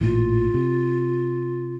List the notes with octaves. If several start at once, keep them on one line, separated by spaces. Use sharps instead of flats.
A1 A#2 E3 F4
C3